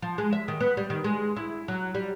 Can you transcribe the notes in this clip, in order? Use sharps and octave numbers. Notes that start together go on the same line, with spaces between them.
F3
G#3
E5
D#3
B3
G3
D#3
G#3
E4
F#3
G3